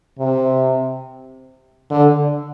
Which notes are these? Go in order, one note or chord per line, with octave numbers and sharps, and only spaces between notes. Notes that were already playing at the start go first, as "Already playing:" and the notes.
C3
D3